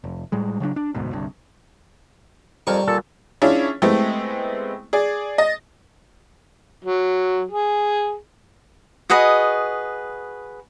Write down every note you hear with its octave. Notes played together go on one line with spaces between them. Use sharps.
F1
A2 G3 G#3
C#3 F#3 B3 D4
D4
E1 D2 G#2 B2
G1 C2 G2
F2 G3 A#4 D5 C#6
A#2 A4
C#4 D4 E4 F4 G#4 C#5
G#3 A3 B3 C4 E4 G4
G#4 D5
D#5 A6 A#6
F#3
G#4
F#4 G#4 B4 D#5